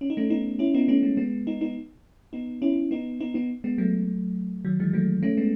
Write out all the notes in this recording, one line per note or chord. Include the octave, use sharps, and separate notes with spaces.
C#4
D#4
A3 C#4
B3 D#4
C#4 E4
B3 D#4
A3 C#4
G#3 B3
G#3 B3
B3 D#4
B3 D#4
B3 D#4
C#4 E4
B3 D#4
B3 D#4
B3 D#4
G#3 B3
F#3 A3
D#3 F#3
E3 G#3
F#3 A3
A3 C#4
G#3 B3